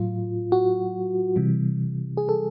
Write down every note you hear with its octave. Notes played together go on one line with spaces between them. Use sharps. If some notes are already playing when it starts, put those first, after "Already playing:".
Already playing: A2 F#3 F4
F#4
C3 E3 G3
G#4
A4